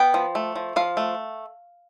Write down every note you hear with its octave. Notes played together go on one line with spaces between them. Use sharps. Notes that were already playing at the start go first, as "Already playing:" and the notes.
Already playing: B3 G5
F3
A3
F3
F3 F5
A3